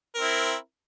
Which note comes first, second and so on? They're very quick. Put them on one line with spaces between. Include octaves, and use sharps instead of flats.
A#4 C4 E4